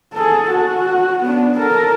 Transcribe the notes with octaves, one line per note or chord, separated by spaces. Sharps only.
G#4 A4
F#4
B3 D4
A4 A#4